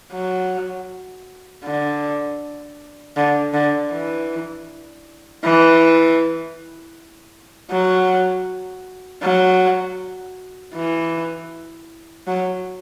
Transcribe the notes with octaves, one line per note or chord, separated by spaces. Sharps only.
F#3
D3
D3
D3
E3
E3
F#3
F#3
E3
F#3